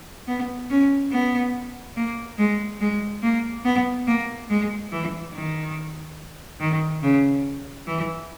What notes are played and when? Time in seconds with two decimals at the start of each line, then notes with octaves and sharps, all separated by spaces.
0.28 B3
0.70 C#4
1.12 B3
1.97 A#3
2.39 G#3
2.81 G#3
3.23 A#3
3.65 B3
4.07 A#3
4.50 G#3
4.92 E3
5.34 D#3
6.60 D#3
7.03 C#3
7.88 E3